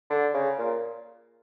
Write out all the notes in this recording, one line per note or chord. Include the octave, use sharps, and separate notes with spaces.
D3
C#3
A#2